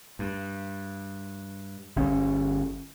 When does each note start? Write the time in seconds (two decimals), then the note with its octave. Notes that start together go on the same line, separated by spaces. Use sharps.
0.19 G2
1.96 G1 C#4